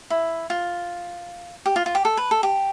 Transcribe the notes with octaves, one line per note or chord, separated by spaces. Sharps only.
E4
F4
G4
F4
F4
G4
A4
B4
A4
G4